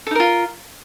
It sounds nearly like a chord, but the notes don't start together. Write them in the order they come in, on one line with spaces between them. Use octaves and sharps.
A4 D#4 A#4 F4